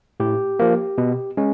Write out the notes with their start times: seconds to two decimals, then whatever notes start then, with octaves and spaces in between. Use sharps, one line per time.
0.20 A2 G4
0.59 F3 A#3
0.98 B2
1.37 G#3 C#4